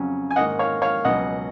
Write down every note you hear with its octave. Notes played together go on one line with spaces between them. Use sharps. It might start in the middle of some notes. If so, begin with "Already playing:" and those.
Already playing: F2 C#3 F#3 C#4
G#5
G#2 D#3 A#3 D#5 F#5
C#5 F5
C#5 F5
C#2 B2 F#3 C#4 D#5 F#5